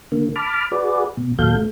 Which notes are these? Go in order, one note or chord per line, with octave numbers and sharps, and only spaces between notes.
D3 A#3
A5 B5 D6 F6
F#4 G#4 B4 D5
B2
D#2 A#2 F#3 A4 F5 G6
A3